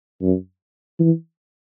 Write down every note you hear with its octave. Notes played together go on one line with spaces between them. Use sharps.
F#2
E3